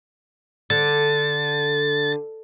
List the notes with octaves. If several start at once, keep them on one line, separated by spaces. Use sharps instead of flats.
D3 A6